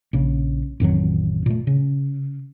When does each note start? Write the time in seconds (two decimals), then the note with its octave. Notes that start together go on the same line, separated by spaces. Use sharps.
0.13 A#1 C#3
0.80 A1 F2 D#3 F#3
1.46 A#2 A3
1.67 C#3